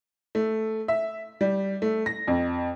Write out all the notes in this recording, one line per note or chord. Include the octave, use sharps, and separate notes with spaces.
A3
E5
G3
A3
A#6
F2